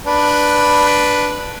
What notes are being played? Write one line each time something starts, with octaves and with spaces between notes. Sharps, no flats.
D4 B4